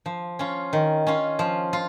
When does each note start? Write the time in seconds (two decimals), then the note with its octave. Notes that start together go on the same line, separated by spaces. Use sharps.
0.06 F3
0.39 C#4 F4
0.73 D#3
1.07 C#4 F4
1.39 F3
1.73 F4